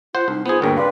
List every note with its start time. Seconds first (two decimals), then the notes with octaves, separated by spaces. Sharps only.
0.15 F4 C5 F#5
0.28 C2 D#4
0.46 B3 F4 G#4 C5
0.62 D2 G2 A#3 G#4 A#4 C#5 G5
0.77 B4 D5 F5 C6